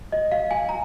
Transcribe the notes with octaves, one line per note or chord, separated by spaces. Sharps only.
D#5
F5
G#5
A#5